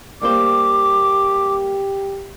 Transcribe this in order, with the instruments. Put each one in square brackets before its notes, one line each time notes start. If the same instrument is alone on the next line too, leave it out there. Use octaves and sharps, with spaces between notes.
[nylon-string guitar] G3 A#3 C5 [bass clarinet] G4 [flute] D6